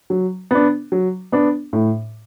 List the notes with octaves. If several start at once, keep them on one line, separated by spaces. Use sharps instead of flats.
F#3
B3 D4
F#3
B3 D4
A2